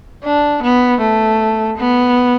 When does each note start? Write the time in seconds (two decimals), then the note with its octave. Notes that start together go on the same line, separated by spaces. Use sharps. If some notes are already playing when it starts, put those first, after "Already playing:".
0.24 D4
0.62 B3
1.01 A3
1.77 B3